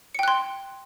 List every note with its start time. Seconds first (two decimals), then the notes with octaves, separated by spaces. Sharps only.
0.15 C#7
0.19 G5
0.23 F#6
0.28 C6